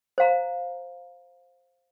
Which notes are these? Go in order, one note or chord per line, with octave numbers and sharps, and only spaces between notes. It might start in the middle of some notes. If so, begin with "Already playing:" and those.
C5 F5 A#5